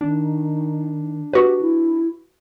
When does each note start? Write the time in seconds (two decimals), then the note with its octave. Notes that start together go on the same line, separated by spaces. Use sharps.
0.01 D#3 D4
1.33 F#4 G4 B4
1.61 E4